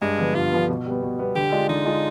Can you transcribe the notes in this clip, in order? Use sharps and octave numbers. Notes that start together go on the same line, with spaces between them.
G2 G#3
D3 F3 B3
G2 F4
D3 F3 B3
B2
G3 B3
B2
G3 B3
D3 G4
G#3 D4 F4
D3 D#4
G#3 D4 F4